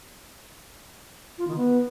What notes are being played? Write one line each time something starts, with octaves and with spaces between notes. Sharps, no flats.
F4
D#3
B3